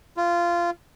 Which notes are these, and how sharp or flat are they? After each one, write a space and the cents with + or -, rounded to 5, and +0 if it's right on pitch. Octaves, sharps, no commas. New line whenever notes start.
F4 -15